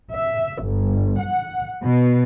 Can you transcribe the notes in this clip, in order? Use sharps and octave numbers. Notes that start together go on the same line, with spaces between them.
E5
G1
F#5
B2